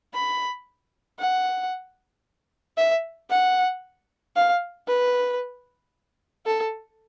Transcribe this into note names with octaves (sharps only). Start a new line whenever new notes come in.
B5
F#5
E5
F#5
F5
B4
A4